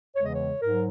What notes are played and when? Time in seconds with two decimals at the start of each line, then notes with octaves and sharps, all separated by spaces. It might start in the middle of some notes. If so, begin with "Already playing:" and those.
0.16 E2 C#3 E3 G#3 C#5
0.26 D#5
0.35 C#5
0.61 G#2 F#3 A#4